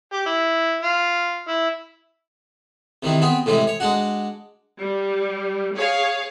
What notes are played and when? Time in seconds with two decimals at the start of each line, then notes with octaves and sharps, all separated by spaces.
0.13 G4
0.26 E4
0.82 F4
1.48 E4
3.03 C3 D#3 E3
3.22 B3 C4 G#4
3.46 A2 C3 E3 G#3
3.67 C#5
3.80 G#3 D4 F#4
4.79 G3
5.75 G#4 C#5 F5